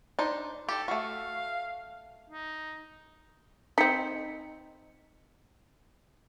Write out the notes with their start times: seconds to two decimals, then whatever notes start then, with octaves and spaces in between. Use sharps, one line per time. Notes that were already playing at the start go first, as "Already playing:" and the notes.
0.19 D4 D#4 C5
0.69 G4 A4
0.88 A3 F#4 F5
2.30 D#4
3.78 C4 D#4 B6 C#7